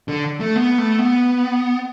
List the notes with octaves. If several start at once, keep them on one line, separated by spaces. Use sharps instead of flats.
D3
A3
B3
A3
B3